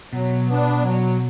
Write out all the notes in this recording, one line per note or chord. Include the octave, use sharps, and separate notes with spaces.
B2 F#3
B3 D4
F#3